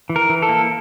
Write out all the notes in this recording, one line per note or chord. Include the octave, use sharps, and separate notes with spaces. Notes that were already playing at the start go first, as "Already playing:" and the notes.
E3
A#4
E3
A4
A#3